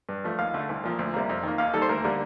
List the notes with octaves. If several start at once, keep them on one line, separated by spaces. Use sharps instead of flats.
G2
F3 A3
D#2 F5
D3 A3
C2
A#2 F3 A#3
D2
C3 G3 A#3
F2
D#3 A#3
D#2 F5
D#3 G3 A#3 A4
C5
D2 A#4
D3 G3 A#3